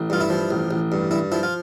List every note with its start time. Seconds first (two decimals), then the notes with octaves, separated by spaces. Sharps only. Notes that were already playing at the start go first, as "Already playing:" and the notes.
Already playing: A1
0.10 G2 F4
0.21 E4
0.30 F3
0.51 A1
0.71 A1
0.92 G2
1.11 G2 E4
1.32 F3 E4
1.43 F4